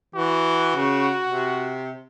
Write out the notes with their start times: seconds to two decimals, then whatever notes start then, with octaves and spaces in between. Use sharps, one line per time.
0.15 E3 F#4
0.76 C#3
1.28 C3